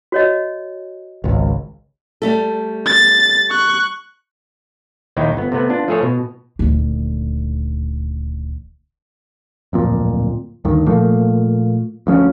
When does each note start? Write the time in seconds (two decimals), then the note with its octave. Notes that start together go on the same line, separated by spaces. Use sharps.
0.12 F#4 C#5 D#5
1.24 G#1 C#2
2.22 G3 A3 A4
2.86 A6
3.50 C#6 F#6
5.16 A#1 D#2 D#3 D#4 E4 G5
5.37 G1 B3
5.52 C3 A3 B3 B4
5.70 B3 D4 F4
5.88 F3 A3 G#4 A4 C#5
6.03 B2
6.59 D#1 D2
9.73 D1 F2 A#2
10.65 D2 G2 D#3
10.87 A#2 F3 A3 A#3
12.07 D2 F3 A3 C#4